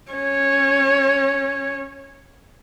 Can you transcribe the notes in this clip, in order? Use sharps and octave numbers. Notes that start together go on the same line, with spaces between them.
C#4 C#5